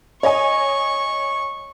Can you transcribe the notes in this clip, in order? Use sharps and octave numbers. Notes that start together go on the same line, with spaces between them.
C#5 D#5 G#5 C#6